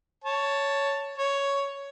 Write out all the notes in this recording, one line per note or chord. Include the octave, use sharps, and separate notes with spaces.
C#5 A5
C#5